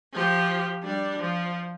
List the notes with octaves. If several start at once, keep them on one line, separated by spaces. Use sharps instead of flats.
F3 G4
G3 D4
F3